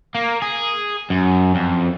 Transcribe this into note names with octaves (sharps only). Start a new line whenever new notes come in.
A#3
G#4
F#2
F2